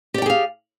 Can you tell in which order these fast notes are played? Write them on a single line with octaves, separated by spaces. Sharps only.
G4 D5 G5 G#4 F5